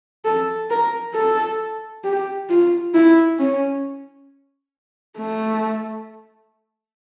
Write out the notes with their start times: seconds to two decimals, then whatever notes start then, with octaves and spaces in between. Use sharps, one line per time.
0.25 A4
0.70 A#4
1.15 A4
2.04 G4
2.49 F4
2.94 E4
3.39 C#4
5.18 A3